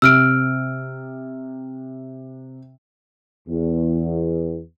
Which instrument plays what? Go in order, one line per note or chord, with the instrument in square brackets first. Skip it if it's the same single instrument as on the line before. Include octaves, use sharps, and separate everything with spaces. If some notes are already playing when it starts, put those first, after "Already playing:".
[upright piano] C3 [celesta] E6 F6 D7
[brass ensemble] E2